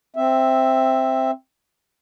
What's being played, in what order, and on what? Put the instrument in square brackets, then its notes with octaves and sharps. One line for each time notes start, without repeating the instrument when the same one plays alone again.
[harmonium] C4 E5